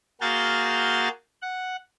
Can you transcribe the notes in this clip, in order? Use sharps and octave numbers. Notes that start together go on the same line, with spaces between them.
A#3 F#4 G#4 F6 G6 A6
F#5